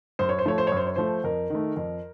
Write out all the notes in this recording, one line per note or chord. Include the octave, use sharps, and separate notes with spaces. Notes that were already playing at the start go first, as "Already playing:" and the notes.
F#2 C5
C#5
C5
F3 A3 C#5
C5
C#5
F#2
C5
C#5
F3 A3 C5
F2 A#4
D#3 A3
F2